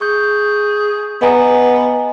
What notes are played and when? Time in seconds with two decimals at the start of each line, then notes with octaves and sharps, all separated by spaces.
0.01 G#4 C#6 G6
1.22 B3 D#5 G#5 A#5